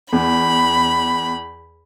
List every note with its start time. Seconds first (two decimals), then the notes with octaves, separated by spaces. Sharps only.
0.13 E2 B5